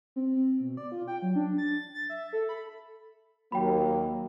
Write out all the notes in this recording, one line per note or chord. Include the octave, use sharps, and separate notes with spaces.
C4
B2
D5
F4
G5
F#3
D4
A6
A6
E5
A4
B5
D#2 F#3 A#3 G5 B5